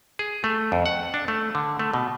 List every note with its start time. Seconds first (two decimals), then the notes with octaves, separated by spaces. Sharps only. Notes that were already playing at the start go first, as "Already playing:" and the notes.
0.19 G#4
0.44 A3
0.72 F2
0.86 F#5
1.14 D4
1.28 A3
1.55 D3
1.79 A3
1.93 B2